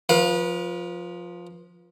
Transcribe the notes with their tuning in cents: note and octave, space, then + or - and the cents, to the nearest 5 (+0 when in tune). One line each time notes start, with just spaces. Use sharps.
F3 +10 B4 -30 F5 +15